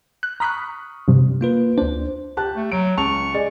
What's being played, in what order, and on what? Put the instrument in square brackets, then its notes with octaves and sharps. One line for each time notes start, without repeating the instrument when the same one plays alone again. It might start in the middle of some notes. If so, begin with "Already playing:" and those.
[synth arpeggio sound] F#6
[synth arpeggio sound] A#5 B5 F#6 [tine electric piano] C#6 D#6 F6
[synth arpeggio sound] G2 C3
[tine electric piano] A#3 F4 B4
[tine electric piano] D2 C5 [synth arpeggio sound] D4
[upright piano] G4 A5 F#6
[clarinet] A3
[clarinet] F#3 [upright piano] D7
[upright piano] C#2 A5 F7 [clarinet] C#6
[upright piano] G#4 D5 D#5